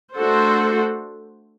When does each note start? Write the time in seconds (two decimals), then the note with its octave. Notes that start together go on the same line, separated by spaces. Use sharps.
0.17 A3 D4 F#4 A4 C5